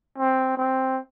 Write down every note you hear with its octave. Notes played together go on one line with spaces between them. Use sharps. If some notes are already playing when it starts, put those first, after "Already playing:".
C4
C4